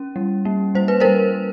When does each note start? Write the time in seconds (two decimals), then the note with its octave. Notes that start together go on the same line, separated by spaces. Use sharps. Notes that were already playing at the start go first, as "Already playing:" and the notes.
Already playing: C#4
0.16 G3
0.45 A#3
0.75 G3 C5
0.88 B4
1.00 G3 A#4 C5